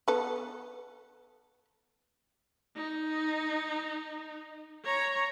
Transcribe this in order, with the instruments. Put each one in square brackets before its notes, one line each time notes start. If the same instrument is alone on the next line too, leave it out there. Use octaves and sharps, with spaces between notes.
[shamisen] B3 A4
[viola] D#4
C#5 A#5